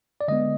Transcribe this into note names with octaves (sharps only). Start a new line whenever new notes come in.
D5
D3 G#3 B3 D#5